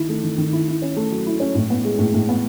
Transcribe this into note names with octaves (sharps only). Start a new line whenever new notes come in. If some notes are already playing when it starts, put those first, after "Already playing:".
Already playing: D#3 E4
A3
D#3
D#3
E4
E4
C#4
A3
F#3
E4
C#4
A2
B3
G#3
A2
A2
B3